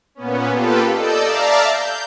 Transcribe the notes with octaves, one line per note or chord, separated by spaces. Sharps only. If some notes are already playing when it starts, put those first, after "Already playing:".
A#2 B3 C#4
A#3 F4 G4 A4 B4
A4 D5 D#5 E6 G6
D5 E5 F5 A5 A#5
G6